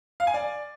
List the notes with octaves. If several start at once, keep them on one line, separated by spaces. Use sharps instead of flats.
F5
G#5
D5